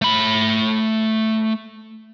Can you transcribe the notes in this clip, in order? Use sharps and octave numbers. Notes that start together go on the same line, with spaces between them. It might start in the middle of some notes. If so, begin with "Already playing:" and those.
A3 B5